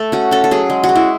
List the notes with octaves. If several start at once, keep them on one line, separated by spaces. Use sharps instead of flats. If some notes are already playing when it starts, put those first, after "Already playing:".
Already playing: A3 A4
C#4 F#4
C#4 A4
A4
F#3 G#4
G#3
F#4
G#3
E4